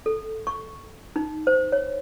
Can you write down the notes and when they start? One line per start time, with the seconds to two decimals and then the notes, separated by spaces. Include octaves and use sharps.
0.06 A4
0.47 C#6
1.16 D#4
1.47 C5
1.72 C#5